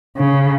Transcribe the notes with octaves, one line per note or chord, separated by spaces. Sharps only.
C#3